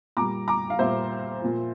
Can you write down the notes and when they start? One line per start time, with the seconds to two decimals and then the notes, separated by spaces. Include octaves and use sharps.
0.17 A#2 G3 A#5 D6
0.48 A#5 D6
0.70 F5
0.79 A#2 G3 C5 E5
1.42 A#2 F3